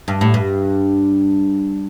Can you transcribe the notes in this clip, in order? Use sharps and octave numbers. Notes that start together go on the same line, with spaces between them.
G2
A2
G2